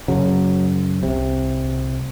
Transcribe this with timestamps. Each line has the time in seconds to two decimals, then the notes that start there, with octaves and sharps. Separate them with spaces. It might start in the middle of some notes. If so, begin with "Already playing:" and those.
0.08 F#2 C#3 F#3
1.03 C2 C3